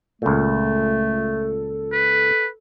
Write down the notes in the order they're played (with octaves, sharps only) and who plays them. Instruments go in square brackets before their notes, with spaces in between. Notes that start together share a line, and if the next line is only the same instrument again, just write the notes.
[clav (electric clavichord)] C#2 A#2 [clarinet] A3 [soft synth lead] A4
[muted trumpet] B4